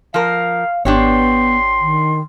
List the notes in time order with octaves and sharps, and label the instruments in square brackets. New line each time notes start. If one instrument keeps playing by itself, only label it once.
[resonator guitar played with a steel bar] F3 A#4 [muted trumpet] F5
[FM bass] G#1 [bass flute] B3 [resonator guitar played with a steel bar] D4 G4 C#5 [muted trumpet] C6
[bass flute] D#3